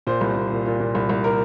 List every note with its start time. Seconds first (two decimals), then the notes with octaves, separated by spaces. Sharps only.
0.07 A#2 C5
0.21 C2
0.36 A#2
0.52 A#2
0.66 A#2
0.80 A#2
0.95 C2
1.09 C2
1.24 A#4